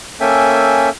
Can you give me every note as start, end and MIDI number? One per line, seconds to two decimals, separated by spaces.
0.21 0.89 58
0.21 0.89 61
0.21 0.89 69
0.21 0.89 76
0.21 0.89 79
0.21 0.89 80